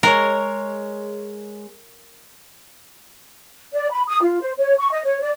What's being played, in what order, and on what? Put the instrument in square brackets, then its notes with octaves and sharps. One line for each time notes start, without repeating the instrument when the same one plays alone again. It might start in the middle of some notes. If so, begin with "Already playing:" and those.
[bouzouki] G#3 C#5 [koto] A#4
[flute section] D5
B5
D#6
F4
C5
C#5
C#6
D#5
C#5
D5